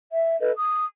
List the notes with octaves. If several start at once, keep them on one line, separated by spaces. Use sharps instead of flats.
E5
A4 B4 D#5
D#6